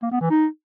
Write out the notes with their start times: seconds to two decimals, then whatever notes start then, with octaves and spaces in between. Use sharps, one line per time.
0.02 A#3
0.11 B3
0.21 E3
0.30 D#4